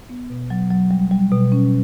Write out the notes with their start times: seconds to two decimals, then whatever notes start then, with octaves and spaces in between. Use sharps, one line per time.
0.10 B3
0.30 B2
0.50 F#3
0.71 F#3
0.91 G3
1.11 G3
1.31 B2
1.52 C#4